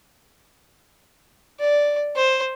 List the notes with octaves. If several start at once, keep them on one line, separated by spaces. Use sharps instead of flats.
D5
C5